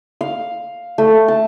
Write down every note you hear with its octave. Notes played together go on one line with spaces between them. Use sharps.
F5
A3
A5